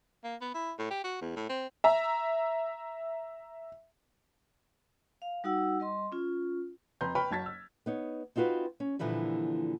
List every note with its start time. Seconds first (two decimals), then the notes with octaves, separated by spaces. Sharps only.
0.24 A#3
0.41 B3
0.54 E4
0.79 A2
0.90 G4
1.04 F#4
1.21 E2
1.36 A2
1.49 C4
1.84 E5 A#5
5.22 F5
5.44 G3 D#4 F#4 F#5 E6
5.80 G3 D#5 C6
6.12 C#4 F4
7.01 F2 B4 A#5 C6 G6
7.15 B4 G5 B5 C#6 F6
7.31 F#1 F#3 A5 G#6 A6 B6
7.46 E6
7.86 B3 D#4 C#5
8.36 C4 D#4 F4 F#4 B4
8.80 C#4
8.99 A#2 D3 E3 F3 G3